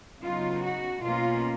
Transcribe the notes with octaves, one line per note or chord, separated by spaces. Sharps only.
C#3 F#3 B3 D#4 F4
F#4
B2 A#3 C#4 F4